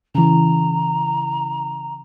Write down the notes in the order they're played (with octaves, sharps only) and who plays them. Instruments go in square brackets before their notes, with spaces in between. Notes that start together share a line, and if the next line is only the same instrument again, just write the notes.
[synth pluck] C#3 E3 [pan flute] A#5